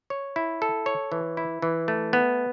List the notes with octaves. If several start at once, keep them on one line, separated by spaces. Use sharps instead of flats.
C#5
E4
A4
C#5
E3
E4
E3
A3
B3